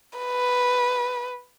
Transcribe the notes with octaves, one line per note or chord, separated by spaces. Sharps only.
B4